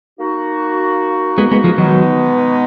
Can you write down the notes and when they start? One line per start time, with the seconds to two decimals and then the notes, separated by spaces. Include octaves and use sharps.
0.18 A#3 D#4 F#4
1.38 G#3 B3
1.51 G#3 B3
1.64 F3 G#3
1.78 B2 D#3 F#3 G#3 B3 D#4